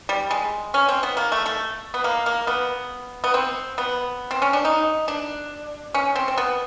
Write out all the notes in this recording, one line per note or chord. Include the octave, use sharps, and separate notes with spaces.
G3
G#3
C#4
C4
B3
A#3
A3
A3
B3
A#3
A#3
B3
B3
C4
B3
C4
C#4
D4
D#4
D4
C#4
C4
C4
B3